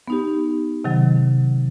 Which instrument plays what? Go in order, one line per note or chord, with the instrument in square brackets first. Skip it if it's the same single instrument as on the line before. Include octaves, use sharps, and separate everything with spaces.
[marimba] B3 D#4 G4
C3 D#3 F#3